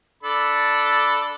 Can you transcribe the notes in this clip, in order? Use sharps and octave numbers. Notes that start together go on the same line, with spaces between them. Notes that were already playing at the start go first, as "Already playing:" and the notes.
D4 A4 B5